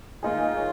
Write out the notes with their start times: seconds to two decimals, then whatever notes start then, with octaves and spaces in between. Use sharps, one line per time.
0.23 D#3 A#3 D#4 F4 G#4
0.57 C#5